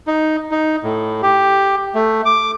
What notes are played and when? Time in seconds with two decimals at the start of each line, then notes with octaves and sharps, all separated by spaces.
0.07 D#4
0.51 D#4
0.83 A2
1.22 G4
1.95 A3
2.25 D6